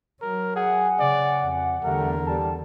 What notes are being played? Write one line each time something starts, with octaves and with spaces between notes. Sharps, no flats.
F#3 A#4
G#4 F#5 G#5
C#3 D5
F2
E2 D3 G3 A3 A#4
G3 A5